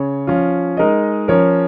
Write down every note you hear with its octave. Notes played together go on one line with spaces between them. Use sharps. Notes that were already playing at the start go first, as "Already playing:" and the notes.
Already playing: C#3 C#5
F3 C#4 F4
G#3 D#4 A#4 D#5
F3 C#4 A#4 C#5